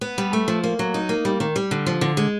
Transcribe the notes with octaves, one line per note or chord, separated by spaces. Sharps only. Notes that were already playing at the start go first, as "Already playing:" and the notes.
B3
G3
A3
F3
A#3
F#3
D#4
A#3
G3
D#3
G3
D3
F3
D3
G#3